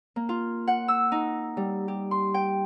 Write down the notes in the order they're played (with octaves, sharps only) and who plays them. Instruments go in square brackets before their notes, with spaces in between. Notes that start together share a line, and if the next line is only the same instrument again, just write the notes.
[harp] A#3
F4
F#5
E6
D#4
G3
G4
C6
G5